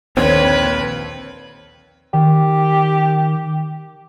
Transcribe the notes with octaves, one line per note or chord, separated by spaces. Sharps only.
A#1 D#2 D3 C4 B4 C#5 G#6
D#3 G4